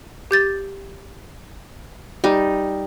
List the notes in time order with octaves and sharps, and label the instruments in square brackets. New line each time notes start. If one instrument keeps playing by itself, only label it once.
[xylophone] G4 G6 A6
[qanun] G3 D#4